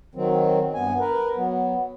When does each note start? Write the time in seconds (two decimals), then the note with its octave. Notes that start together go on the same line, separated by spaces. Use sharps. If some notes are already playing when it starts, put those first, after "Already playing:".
0.15 D#3 F#3 C4
0.74 G2 B3 G#5
1.00 A#4 B4
1.36 F#3 B3